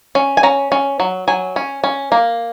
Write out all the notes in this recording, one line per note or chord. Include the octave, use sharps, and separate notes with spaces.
C#4
G#5
C#4 A#5
C#4
F#3
F#3 G#5
C#4
C#4
A#3